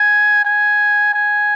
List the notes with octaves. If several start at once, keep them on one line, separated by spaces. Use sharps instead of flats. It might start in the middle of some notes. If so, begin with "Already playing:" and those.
Already playing: G#5
G#5
G#5